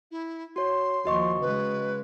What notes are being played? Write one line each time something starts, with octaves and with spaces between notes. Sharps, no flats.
E4
F#4 C#5 C6
D#2 F3 F#4 D#5 C#6
C#3 G#3 B4